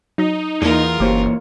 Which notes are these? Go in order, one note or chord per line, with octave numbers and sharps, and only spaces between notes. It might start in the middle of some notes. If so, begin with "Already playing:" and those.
F#3 D#4 D#5
E2 E3 A#3 F4 G#4 A#4
F#1 E3 A#3 G4 C5 C#5